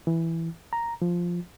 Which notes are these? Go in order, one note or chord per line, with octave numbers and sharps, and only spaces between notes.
E3
A#5
F3